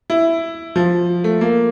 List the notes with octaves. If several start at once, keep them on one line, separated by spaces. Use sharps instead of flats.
E4
F3
A3
A#3